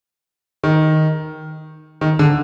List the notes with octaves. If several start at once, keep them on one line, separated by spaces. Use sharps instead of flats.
D#3
D#3
D3